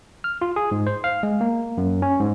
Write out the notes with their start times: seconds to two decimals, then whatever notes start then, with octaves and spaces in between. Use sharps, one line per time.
0.24 F6
0.41 F4
0.56 G#4
0.71 G#2
0.87 C5
1.04 F5
1.23 G#3
1.41 A#3
1.77 F#2
2.02 C#4
2.20 G#2